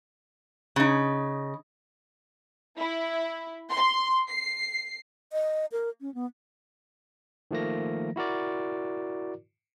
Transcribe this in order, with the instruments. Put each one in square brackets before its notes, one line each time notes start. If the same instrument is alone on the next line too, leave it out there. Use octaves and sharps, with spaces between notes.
[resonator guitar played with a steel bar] C#3 D#4
[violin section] E4
C6
C7
[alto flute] D#5
A#4
C#4
B3
[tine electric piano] D#3 F3 A3 A#3 A#6
E4 F#4 A#4 D5